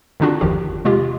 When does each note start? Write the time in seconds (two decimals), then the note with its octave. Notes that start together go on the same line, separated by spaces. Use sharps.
0.20 D3 D#3 C4 D4 F4 F#4
0.41 G1 E2 D#3 F3 G4
0.85 C3 G#3 F4 G4